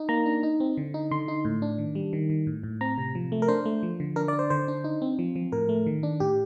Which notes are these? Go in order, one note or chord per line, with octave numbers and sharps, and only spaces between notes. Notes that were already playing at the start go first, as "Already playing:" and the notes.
Already playing: D#4
A#3 A#5
D4
D#4
C4
D3
D#4
D3 C6
D#4
A2
D4
D#3
G3
D#3
D#3
A2
A2
C4 A#5
C3
F3
A3
A#4
D4 C5
A3
F3
D3
D4 A#4
D5
D4
C5
D3 C5
D4
D#4
C4
F3
F3
A2 A#4
A3
D#3
D4
A2 G4